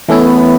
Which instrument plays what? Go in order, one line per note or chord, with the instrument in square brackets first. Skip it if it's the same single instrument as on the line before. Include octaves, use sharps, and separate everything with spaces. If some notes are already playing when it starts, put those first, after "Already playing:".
[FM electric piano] E3 A3 C#4 E4 [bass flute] B3